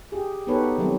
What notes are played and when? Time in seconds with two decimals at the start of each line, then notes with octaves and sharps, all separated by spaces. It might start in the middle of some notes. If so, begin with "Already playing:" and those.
0.12 G4 G#4
0.47 B3 D#4 G4 A4 B4 C#5
0.78 D#3 F#3 G3 A3 C4